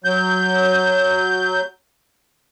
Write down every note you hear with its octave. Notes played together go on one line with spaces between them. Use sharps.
F#3 G6